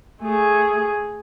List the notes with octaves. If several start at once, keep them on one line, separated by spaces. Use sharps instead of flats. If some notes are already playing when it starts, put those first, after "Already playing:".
A3 G#4